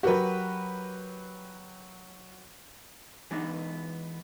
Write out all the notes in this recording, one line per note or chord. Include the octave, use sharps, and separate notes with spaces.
F#3 F#4 G4 A#4 B4
E3 G#3 B3 D4 D#4